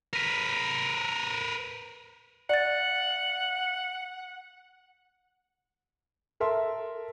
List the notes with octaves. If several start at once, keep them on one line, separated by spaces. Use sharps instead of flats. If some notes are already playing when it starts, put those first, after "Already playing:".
A#4 B4
D5 F#5 A6
A4 A#4 E5 A5 C6